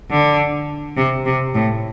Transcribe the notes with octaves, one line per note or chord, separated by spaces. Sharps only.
D3
C3
C3
A2